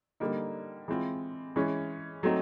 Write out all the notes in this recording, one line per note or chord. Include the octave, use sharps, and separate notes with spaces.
D3 G3 A#3 D#4
E3 G#3 C4 F4
E3 G#3 C#4
F#3 A3 C4 D#4